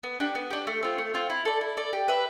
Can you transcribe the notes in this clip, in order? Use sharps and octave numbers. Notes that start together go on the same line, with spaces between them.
B3
D4 G4
B3
D4 G4
A3
C4 F4
A3
C4 F4
E4
A4 D5
E4
A4 D5
G4
B4 E5